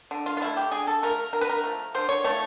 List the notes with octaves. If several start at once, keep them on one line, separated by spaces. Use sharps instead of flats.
D3
F4
F4
F3 A3 E4
G4
D3 G#4
A4
F3 A3 A#4
D3 A#4
B4
A#4
F3 A3
D3 C5
C#5
F3 A3 C#5